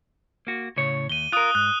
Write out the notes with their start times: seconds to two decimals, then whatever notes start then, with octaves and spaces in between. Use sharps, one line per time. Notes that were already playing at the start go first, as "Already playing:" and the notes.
0.47 A#3 F#4
0.77 A2 C#3 C#5
1.10 D#2 D#7 G7
1.32 F4 A#4 D#6 F#6
1.55 G#2 F#6